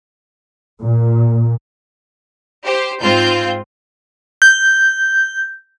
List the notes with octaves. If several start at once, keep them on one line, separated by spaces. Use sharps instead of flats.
A#2
G4 C5
G#2 C4 F4 G6
G6